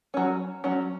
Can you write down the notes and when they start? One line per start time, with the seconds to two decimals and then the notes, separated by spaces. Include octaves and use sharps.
0.14 F#3 C#4
0.64 F#3 C#4